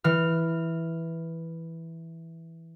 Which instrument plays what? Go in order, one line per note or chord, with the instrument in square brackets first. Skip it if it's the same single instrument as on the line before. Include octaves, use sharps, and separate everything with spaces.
[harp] E3 F6